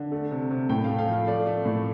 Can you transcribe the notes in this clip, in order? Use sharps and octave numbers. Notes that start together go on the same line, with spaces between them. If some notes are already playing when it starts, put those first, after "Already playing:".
Already playing: D3
A3
C3
C3
A2 G5
A3 F5
F5
F3
F5
A3 D5
A3
A2